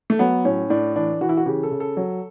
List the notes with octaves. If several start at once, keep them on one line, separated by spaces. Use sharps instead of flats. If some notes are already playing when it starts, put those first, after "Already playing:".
A3
F#3 B3
A2 C#4
A2 D4
E3 D4
E3 F#4
E4
F#4
C#3 G4
A4
C#3
A4
F#3